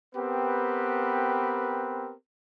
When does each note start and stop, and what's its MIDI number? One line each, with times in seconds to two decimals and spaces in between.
0.15 2.14 59
0.15 2.14 60
0.15 2.14 67
0.15 2.14 70
0.15 2.14 71